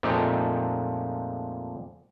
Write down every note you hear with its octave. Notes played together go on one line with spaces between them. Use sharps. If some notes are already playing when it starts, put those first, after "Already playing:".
F2 A#2 G#3 A3 D#4 G4